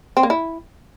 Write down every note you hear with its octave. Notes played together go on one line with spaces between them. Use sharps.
C4
A#3
E4